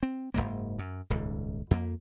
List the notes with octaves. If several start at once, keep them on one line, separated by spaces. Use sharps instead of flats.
C4
F#1 D#2 G#2 A#3
F#2
D#1 C#2 G#2
F2 A#3